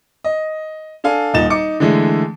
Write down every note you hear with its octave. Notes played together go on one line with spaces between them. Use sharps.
D#5
D4 A4 F5 G#5
D#1 A#2 D#4 A6 E7
D#4 D6 C#7
D3 E3 G#3 A3